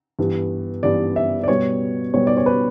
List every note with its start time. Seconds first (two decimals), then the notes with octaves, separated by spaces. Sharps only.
0.19 G2 E3 B3
0.83 G2 E3 B3 D5
1.16 E5
1.44 D5
1.48 B2 G3 B3 C#5
2.14 B2 G3 B3 C#5
2.27 D5
2.37 C#5
2.46 B4